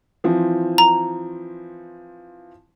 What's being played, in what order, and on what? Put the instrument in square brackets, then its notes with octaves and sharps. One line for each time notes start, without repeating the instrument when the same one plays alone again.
[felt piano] E3 F3 C4
[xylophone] A#5